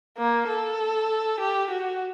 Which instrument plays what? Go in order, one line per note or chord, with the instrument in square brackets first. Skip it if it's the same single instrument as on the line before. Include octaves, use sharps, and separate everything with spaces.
[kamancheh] A#3
A4
G4
F#4